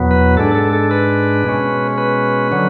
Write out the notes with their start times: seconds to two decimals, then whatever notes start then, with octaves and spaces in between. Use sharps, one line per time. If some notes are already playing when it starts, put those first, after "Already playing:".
Already playing: E2 B2 F#3 B3
0.11 B4
0.37 G#2 G#3 D4 A4
0.55 A4
0.73 A4
0.91 B4
1.44 B2 G#3 C#4
1.98 B4
2.52 D3 F#3 C#4